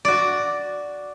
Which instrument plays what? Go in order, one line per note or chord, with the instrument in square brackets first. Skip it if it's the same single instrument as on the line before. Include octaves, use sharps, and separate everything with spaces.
[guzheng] F#4 D5